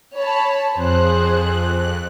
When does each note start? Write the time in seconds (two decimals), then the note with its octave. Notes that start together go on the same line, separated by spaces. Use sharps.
0.17 C#5 A5 B5
0.75 F2 G#4 C5 F#6